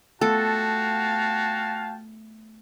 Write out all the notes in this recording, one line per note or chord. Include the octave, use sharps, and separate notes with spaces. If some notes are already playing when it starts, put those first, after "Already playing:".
A3 B3 F4 F#4 A4 F5 G5 A5